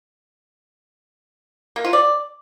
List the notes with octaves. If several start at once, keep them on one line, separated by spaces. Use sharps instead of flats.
A#3
F4
D5